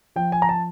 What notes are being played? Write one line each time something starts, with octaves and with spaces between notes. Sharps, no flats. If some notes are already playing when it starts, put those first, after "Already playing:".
F3 G5
G#5
A#5
A5